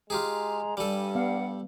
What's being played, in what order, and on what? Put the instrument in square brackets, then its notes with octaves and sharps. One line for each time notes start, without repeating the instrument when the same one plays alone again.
[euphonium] G#3 [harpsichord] F4 G4 G#4 [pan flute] A#5
[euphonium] G2 [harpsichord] G3 A4 [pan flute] G#5
[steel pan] B3 F5 [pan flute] F#5